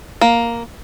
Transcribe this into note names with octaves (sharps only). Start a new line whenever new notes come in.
A#3